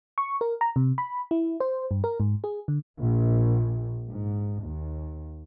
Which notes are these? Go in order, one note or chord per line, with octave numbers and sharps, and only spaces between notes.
C#6
A#4
A#5
C3
B5
E4
C5
G2
A#4
G#2
G#4
D3
A#1
G#2
D#2